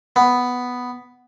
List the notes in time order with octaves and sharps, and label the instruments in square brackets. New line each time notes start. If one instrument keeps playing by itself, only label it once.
[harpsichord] B3